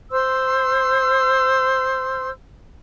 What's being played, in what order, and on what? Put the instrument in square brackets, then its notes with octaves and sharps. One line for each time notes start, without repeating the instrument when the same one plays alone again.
[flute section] C5 C6 E6